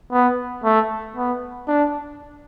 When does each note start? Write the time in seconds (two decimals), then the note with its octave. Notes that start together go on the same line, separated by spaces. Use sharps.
0.12 B3
0.64 A3
1.16 B3
1.68 D4